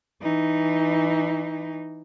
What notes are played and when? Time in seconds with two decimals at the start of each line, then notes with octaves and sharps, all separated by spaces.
0.22 E3 D#4